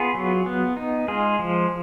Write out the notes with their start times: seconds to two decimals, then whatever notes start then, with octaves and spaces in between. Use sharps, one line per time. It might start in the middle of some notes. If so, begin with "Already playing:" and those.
Already playing: B3 F4 G#4
0.14 F#3
0.46 B3
0.77 D#4
1.08 G#3 F4 G#4
1.39 F3